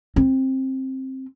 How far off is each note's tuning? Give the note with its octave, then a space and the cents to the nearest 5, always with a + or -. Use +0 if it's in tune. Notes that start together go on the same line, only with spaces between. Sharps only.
C4 +15